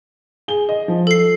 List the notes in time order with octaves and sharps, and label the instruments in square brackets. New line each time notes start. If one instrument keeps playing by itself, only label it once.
[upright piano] G#4 G7
D#5
F3
[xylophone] A4 C7